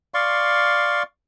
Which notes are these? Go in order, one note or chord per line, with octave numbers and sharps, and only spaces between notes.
D5 F5 C6 C#6